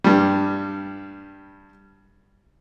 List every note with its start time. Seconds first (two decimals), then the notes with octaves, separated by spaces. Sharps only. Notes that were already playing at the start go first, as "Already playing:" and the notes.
0.04 G2 G3